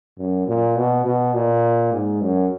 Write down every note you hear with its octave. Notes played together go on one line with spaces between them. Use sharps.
F#2
A#2
B2
B2
A#2
G#2
F#2